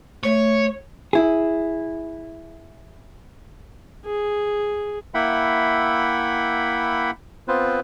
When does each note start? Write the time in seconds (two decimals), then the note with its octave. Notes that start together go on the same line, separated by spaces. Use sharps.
0.23 A3 C#5
1.13 E4 G#4
4.06 G#4
5.14 A#3 E4 E5 F#5 G5 B5
7.48 B3 C4 F4 B4 C5